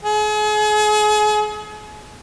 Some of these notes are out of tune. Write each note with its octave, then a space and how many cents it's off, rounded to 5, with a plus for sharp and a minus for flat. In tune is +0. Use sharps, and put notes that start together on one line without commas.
G#4 +35